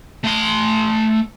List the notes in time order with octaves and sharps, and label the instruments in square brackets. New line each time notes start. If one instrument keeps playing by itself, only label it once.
[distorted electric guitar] A3 C6